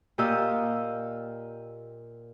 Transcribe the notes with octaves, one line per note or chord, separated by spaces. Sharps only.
A#2 G4 D#5 F5 D#6 E6